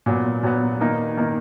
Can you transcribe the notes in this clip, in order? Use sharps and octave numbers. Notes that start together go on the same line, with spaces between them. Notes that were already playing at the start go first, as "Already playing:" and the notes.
A#2 F#3 B3
A#2 F#3 B3
D#3 A#3 D#4
D#3 A#3 D#4